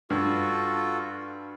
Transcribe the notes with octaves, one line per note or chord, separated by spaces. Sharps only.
G2 F4 F#4 A4